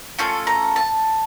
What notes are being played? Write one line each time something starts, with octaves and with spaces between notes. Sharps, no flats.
A3 C#4 F4 A4
A#5
A5